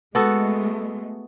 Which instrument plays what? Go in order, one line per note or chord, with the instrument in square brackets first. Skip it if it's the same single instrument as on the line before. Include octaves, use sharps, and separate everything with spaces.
[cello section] G#3 A3 [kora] B3 F#4 A4